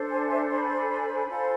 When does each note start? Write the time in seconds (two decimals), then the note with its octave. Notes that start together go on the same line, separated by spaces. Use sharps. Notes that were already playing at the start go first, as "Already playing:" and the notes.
Already playing: D4 A4 C5
0.11 G#5
0.19 A5
0.27 E5 G#5
0.51 G#5 B5
1.29 F4 A4 C5